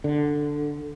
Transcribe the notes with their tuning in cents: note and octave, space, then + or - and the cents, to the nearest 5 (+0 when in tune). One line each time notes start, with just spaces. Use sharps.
D3 +5